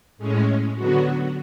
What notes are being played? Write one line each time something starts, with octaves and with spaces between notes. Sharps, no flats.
A2 G#3 C#4
D3 F#3 B3 F#4